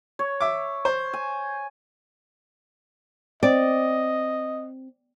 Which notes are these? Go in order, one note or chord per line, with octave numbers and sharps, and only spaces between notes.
C#5
E5 D6
C5
G#5
C4 D5 D#5